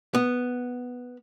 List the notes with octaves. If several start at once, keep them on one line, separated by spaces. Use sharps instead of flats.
B3